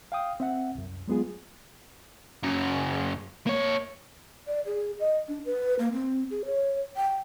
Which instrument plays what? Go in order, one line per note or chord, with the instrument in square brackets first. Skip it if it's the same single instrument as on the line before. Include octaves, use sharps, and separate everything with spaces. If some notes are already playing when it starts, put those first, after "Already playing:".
[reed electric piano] F5 G5 D#6
C4 E5 F#5
C2 F#2
F#3 G#3 B3 F4 G#4
[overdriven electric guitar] F#2 C#3
A#3 C#5
[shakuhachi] D5
G#4
D#5
D4
B4
A#3
C4
G#4
C#5
G5